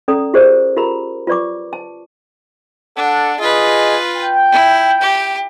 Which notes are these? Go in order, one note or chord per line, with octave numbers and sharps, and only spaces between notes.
C#4 A4 D5 A#5 D#6
F4 G4 G#4 A#4 C5 D5
F4 G4 A#4 A#5 B5
F4 B4 D5 C#6 D6
A5
D4 A4 D5 F#5
F4 G#4 B4 D#5
G5
E4
G4